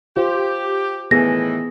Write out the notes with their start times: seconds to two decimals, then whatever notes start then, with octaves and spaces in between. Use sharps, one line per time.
0.17 F4 G4 C5
1.11 A2 D#3 E3 B3 G#4 A#6